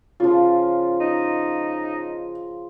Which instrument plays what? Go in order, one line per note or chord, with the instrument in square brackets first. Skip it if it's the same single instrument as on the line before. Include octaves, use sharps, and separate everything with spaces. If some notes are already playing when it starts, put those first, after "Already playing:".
[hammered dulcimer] C#3 F3 [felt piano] F4
[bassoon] D#4